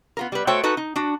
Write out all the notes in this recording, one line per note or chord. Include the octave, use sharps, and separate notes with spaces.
B3 F4 A#4
G3 B4
A3 F#4 A4 C5 C#5 G5
D#4 F#4 A4 B4
D#4
D4 F#4